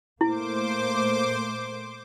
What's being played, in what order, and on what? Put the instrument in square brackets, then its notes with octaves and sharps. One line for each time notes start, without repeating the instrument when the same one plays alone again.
[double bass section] A#2 A3 A#3 [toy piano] E4 [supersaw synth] C5 D6